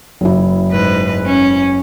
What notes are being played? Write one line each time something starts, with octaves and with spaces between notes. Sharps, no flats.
F#1 E4
G#2 B4
C#4